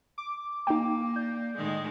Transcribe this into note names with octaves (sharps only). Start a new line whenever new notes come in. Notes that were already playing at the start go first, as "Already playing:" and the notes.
D6
A#3 D#4 G5
D5 G6
A2 D#3 G#3